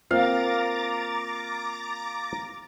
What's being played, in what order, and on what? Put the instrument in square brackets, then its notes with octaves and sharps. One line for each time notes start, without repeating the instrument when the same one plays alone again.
[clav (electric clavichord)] A#3 F4 [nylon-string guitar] C4 [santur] F5 [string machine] A#5 D6 A6